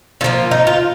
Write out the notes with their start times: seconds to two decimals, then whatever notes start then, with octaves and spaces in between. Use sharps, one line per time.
0.21 D3 F3 A#3 F4
0.51 D#4
0.67 F4